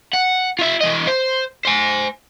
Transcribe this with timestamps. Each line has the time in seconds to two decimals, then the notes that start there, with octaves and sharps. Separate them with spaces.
0.13 F#5
0.59 F4 E5
0.81 E3 D#5
1.07 C5
1.65 C5 G#5